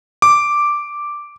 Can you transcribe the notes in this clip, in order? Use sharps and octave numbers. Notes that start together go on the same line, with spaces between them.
D6